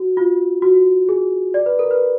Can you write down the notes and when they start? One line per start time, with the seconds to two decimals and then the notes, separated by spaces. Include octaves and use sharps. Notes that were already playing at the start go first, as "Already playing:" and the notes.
Already playing: F#4
0.17 F4
0.62 F#4
1.09 G#4
1.54 D5
1.66 B4
1.79 A#4
1.91 B4